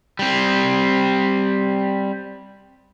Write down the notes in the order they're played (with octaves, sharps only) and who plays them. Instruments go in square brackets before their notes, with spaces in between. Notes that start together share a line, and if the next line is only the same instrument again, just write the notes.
[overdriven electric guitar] G3 C4